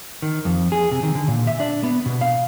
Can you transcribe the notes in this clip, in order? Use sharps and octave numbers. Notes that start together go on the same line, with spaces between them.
D#3
F2
G#4
C3
D#3
D3
A#2
E5
D4
B3
B2
F5